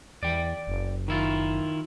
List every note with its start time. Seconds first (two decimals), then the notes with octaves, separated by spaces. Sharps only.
0.23 E2 D5 G5
0.67 F#1
1.08 D#3 E4 F4